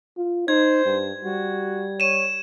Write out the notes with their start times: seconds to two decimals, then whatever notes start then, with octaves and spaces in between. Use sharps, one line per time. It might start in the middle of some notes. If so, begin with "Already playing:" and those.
0.17 F4
0.48 D#4 C5 G#6
0.85 G2
1.24 G3 F#4
2.00 C#5 D#7 E7